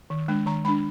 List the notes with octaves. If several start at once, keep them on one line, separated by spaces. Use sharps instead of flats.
D#3
G#3 D4
D#3 A#5
G#3 D4 B5